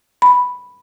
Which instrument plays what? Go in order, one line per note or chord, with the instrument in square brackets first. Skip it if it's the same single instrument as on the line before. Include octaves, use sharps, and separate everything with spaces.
[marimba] B5